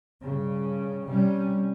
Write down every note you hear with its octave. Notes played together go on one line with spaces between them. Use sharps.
G2 C#3
C3 G3 C#4